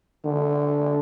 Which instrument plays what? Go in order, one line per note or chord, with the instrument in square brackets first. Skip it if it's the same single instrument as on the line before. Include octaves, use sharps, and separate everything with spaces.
[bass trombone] D3